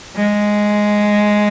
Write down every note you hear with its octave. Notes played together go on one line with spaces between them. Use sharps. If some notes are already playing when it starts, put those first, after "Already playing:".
G#3